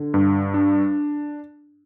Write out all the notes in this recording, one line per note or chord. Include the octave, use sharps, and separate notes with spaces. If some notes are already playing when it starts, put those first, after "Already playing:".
Already playing: D3
G2
D4